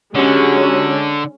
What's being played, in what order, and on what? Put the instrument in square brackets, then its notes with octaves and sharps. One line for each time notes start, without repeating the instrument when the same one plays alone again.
[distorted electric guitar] D3 [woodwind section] F#3 F#4 G4 [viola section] G#3 C#4